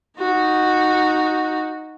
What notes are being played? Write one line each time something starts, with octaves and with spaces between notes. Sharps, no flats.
D#4 F#4